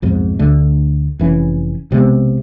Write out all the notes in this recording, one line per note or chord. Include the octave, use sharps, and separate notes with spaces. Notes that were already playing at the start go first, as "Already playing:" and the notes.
B1 F2 G#2
D2 D3 A3
F1 E3 C#4
B1 C3 G#3 B3